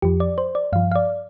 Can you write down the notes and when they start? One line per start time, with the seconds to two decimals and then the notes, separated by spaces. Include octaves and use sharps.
0.02 F2 F3 G4
0.20 D5
0.38 C5
0.55 D5
0.73 G2 F3 F5
0.92 F5
0.96 D5